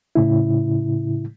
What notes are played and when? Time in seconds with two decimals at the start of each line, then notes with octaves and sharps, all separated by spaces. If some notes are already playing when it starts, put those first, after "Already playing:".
0.15 A2 C#3 E4